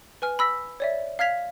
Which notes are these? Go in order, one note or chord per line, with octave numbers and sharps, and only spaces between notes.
B4 G#5 F6
B5 E6 A#6 B6
C#5 D5 E5
F5 F6 G#6 B6 F7